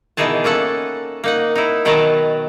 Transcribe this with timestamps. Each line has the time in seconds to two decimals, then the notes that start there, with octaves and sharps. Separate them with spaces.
0.17 B2 D#3 E3 D#4 G#4 A5
0.44 A#3 C#4 A4 F#5
1.24 A#3 D#4 F#5
1.56 D#4 E4
1.85 B2 D#3 F#3 B4 A5 A#5